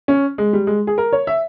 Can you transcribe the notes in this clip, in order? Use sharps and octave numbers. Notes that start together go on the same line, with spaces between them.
C#4
G#3
G3
G#3
G#4
A#4
C#5
E5